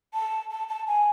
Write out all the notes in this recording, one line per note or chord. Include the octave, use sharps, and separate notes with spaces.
A5
A5
A5
G#5